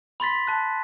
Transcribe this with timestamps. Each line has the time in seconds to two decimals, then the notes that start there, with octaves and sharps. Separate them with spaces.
0.20 B5 C6 A6 B6
0.47 A5 F#6